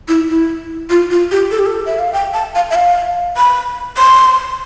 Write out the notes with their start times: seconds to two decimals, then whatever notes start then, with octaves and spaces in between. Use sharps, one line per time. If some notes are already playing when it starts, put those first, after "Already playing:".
0.08 E4
0.29 E4
0.90 F4
1.11 F4
1.31 G4
1.51 A4
1.59 G4
1.66 A4
1.86 E5
1.99 F5
2.13 G5
2.34 A5
2.55 F5
2.70 E5
2.75 F5
3.37 B5
3.98 C6